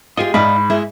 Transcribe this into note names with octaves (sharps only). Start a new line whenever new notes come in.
F4 G4 G#4 D#5
G#2 D#4 D5 F5 B5
G#3 E4